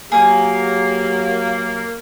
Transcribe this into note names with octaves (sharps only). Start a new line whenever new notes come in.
F#3 A#3 G4 G#4